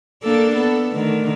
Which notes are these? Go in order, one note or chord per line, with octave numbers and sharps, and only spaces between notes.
A#3 D4 A4
B3 A4
D3 D#3 A3